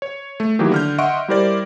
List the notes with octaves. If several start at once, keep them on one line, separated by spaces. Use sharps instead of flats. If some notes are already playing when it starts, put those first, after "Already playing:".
C#5
A3
D#3 E3 F#3 A#3 E4 G4
D3 F6 G6
D#5 E5 F#5 C6 C#6 D7
G3 E4 G4 A#4 C5 D5